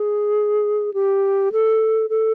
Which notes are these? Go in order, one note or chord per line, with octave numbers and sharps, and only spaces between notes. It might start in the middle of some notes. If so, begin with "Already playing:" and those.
Already playing: G#4
G4
A4
A4